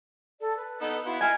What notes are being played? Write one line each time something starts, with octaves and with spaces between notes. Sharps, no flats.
A4 D5
B4
B3 D#4 A4
B3 E4 F#4 F5 C6
E4 F4 D#5 G#5 A#5 F6